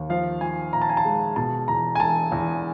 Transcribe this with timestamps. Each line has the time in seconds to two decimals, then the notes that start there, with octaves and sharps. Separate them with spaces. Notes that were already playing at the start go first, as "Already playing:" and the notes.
Already playing: D#2
0.09 F3 F5
0.41 F3 G#5
0.73 A#2 A#5
0.82 A5
0.89 G#5
0.97 A5
1.05 G#3
1.36 B2 A5
1.68 E2 A#5
1.95 G#5
2.00 E1 A5
2.32 E2